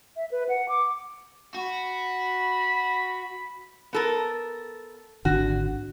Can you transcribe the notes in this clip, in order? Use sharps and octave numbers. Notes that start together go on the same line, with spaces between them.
E5
B4
F#5
D6
F#4 B5
B3 A4 A#4
G#1 D3 F#4